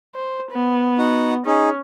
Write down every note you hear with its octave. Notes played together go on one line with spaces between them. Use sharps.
C5
B3
D#4 F#4 F#5
C#4 D#4 G#4